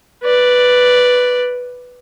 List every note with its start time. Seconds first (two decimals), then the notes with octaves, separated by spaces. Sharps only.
0.23 B4 D5